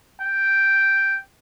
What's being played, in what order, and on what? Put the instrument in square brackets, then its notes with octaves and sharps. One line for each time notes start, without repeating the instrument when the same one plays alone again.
[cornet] G5